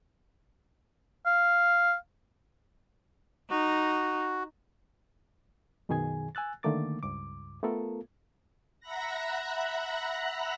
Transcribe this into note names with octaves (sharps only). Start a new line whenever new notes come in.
F5
D#4 F#4
F#2 B2 D#3 G#4 G#5 G#6
G#5 E6 F#6 A6
D3 D#3 A3 A#3 D6 A6
C#2 G2 D6
A3 B3 F4 A4 A#4
E5 F#5 A#5 B5 F#6 A#6